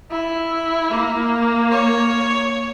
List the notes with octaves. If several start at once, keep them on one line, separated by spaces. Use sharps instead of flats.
E4
A#3
C#5